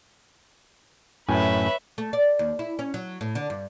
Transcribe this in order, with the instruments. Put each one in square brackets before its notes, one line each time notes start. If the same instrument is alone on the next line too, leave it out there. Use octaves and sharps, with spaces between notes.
[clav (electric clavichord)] F#2 A2 G#5 [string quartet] B4 C#5 E5
[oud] A3
D5
D#2
E4
C#4
F#3
A2
D3
G2